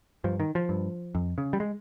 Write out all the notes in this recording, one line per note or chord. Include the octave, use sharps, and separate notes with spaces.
G2 F3
D#3
F3
G2
F2
C#3
G3
G#3